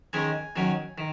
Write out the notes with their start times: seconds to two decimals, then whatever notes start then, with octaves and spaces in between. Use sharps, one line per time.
0.13 D#3 G#3 C#4 G#5
0.56 D#3 F#3 C#4
0.98 D#3